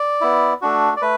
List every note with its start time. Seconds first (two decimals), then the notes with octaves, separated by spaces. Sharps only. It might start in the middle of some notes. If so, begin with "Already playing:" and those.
Already playing: D5
0.21 B3 E4
0.62 A3 D4 F#4
0.97 D5
1.02 A3 B4